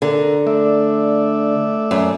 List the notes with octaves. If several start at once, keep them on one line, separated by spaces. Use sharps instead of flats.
D3 A#4
A3 D5 E5
F#2